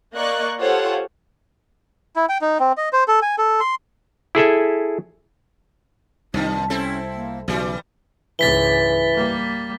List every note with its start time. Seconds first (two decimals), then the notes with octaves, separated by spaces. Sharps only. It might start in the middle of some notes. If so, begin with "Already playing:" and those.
0.15 A#3 D5 D#5 C#6 F#6
0.60 F4 G4 A4 C5 C#5 F#5
2.16 E4
2.29 G5
2.41 D#4
2.60 C4
2.77 D#5
2.93 C5
3.08 A4
3.22 G#5
3.38 A4
3.60 C6
4.35 E4 G#4 A4 E5
6.34 C2 F#2 D#3 F3 D#4
6.70 C4 C#4 E4 A4
7.15 A#3
7.48 B1 C#3 E3 G3 F#4
8.39 C#2 G#2 E3 A6 B6 G7
9.14 G3 A#3